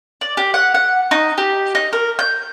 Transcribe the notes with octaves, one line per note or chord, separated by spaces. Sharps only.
D5
G4
F#5
F#5
D#4
G4
D#4
A#4
G6